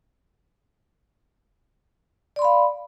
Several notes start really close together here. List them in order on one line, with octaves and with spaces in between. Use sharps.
D5 C6 B5 F5